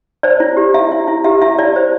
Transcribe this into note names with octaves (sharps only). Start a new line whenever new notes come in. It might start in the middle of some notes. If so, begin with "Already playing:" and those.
C5 D5
E4
G4
E4 E5
E4
E4
G4 E5
E4 E5
E4 D5
C5